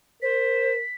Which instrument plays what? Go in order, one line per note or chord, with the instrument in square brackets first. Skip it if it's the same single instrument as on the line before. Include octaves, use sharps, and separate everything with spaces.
[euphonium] A#4 [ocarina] C5 [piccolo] B6